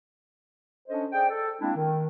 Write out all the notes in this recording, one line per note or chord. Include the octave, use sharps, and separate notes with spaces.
C#4 D4 A4 C5 D#5
G#4 C5 D5 G5
A4
G#3 A#3 C4 D4 E4
D#3